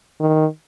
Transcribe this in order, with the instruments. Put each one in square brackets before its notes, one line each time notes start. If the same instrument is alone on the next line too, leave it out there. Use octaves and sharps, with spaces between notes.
[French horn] D#3